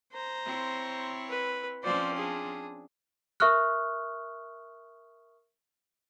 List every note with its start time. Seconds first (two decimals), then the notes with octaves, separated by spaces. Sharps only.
0.12 C5 A#5
0.45 C4 E4 C#5
1.29 B4
1.83 F3 C4 C#4 C5 D5
2.15 D4 G#4
3.40 A#4 E5 C#6 D#6 F6 F#6